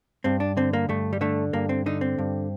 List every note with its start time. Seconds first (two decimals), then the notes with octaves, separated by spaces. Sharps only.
0.24 G2 C4
0.40 D4
0.57 D3 C4
0.73 A#3
0.89 G2 A3
1.13 G3
1.21 D3 A3
1.53 G2 A#3
1.69 C4
1.86 D3 D#4
2.01 C4
2.18 G2